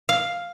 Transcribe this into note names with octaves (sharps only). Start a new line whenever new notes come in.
F5